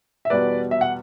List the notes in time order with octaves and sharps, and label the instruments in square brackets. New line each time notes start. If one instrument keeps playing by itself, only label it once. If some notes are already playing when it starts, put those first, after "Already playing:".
[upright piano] E5
E2 B2 G3 B4 D5
E5
F#5